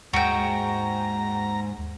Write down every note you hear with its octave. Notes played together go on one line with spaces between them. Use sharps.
D#2 G#2 F#4 G5 A#5